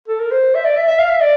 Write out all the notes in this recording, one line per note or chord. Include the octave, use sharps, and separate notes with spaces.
A4
A#4
C5
E5
D5
E5
E5
F5
E5
D5